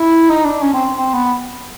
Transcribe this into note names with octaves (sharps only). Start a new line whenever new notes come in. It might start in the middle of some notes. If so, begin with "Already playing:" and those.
Already playing: E4
D#4
D4
C#4
C4
C4
B3